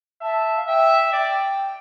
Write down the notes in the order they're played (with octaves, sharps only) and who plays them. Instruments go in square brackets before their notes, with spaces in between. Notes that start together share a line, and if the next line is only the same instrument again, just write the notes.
[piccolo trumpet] E5 [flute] A5
[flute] F5
[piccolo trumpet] E5 [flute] G5
[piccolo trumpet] D5 [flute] G5